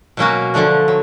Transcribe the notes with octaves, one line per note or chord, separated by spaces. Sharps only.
B2 F#3 A#3 C#4 F#4
D3 F3 A3 D4
F#3